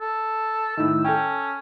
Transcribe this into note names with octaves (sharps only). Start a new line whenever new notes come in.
A4
A2 D#3 E6
C#4 A4 G5